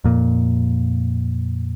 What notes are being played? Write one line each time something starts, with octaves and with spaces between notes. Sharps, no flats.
F2 A#2